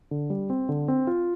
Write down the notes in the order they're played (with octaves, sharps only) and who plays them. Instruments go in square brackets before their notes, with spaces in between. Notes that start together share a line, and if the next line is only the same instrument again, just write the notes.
[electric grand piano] D3
G3
C4
D3
C4
F4